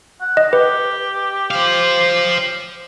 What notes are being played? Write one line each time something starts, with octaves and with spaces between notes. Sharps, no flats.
F#5
D#5
G4 B4
C5 F5